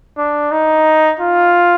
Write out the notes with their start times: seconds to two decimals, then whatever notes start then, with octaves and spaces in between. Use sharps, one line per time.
0.18 D4
0.52 D#4
1.20 F4